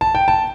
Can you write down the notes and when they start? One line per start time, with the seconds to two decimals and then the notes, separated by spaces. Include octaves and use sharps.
0.01 A5
0.15 G5
0.28 A5